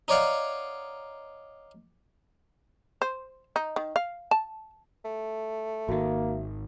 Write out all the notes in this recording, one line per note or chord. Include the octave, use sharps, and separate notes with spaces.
D#4 C#5 D5 F5 F#5
C5
D#4
D#3
F5
A5
A3
G#1 D#3 A#3 F#4 E5